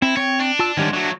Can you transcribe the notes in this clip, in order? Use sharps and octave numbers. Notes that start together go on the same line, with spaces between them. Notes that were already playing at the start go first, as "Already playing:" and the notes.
C4 E4
C4 C#5 G5
D4
F4 A5 E6
G#2 D#3 G3 C#4 D4
F#3 A3 D4 F#4